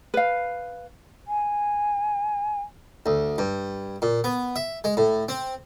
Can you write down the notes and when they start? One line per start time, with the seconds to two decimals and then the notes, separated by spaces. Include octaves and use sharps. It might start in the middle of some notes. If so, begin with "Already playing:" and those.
0.14 B4 F5
1.28 G#5
3.06 D2
3.38 G2
4.02 A#2
4.24 B3
4.56 E5
4.84 G#3
4.97 A2
5.29 C4